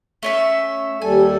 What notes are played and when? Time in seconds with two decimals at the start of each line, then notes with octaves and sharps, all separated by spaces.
0.23 A3 C#4 E5
1.02 D#2 G3 A4 G#5